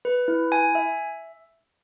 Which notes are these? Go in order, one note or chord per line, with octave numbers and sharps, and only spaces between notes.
B4
E4
G#5
E5